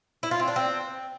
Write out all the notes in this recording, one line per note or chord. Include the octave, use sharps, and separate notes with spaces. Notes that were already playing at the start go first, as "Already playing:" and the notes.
E4
F4
C4
D4
C4